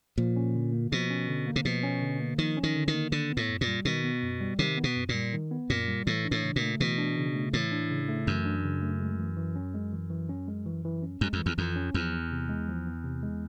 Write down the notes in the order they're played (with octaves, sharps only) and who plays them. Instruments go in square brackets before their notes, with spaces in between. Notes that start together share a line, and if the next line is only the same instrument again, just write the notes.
[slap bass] A#2 [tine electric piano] F3
[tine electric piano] C#4
D3
A#3
[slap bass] B2 [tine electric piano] F3
[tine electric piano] C#4
D3
A#3
[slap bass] C3
[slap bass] B2 [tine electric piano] F3
[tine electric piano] C#4
D3
A#3
[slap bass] D#3 [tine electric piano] F3
[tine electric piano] C#4
[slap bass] D#3
[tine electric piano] D3
[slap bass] D#3
[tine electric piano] A#3
[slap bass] D3 [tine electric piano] D#3
[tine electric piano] B3
[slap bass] A2
[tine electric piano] F#2
[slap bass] A#2
[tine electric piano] G3
[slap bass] B2 [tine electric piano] D#3
[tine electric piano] B3
F#2
G3
[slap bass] C3 [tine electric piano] D#3
[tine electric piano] B3
[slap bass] B2
[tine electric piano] F#2
[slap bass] A#2
[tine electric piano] G3
D#3
B3
[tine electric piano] F#2 [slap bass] A#2
[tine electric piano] G3
[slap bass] A2 [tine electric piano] E3
[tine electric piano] D4
[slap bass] A2
[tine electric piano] C#3
[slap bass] A#2
[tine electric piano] A3
[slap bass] B2 [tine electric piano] E3
[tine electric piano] D4
C#3
A3
[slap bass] A2 [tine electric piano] E3
[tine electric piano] D4
C#3
A3
[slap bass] F#2 [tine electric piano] E3
[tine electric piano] D4
C#3
A3
G#3
E3
E3
C#4
G#3
E3
E3
C#4
G#3
E3
E3
C#4
[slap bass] F#2 [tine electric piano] G#3
[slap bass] F2
[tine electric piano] E3
[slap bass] E2
[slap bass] F2 [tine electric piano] E3
[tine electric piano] C#4
[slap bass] E2 [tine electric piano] F3
[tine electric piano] B3
C3
G#3
F3
B3
C3
G#3